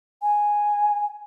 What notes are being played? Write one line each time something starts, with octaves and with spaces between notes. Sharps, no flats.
G#5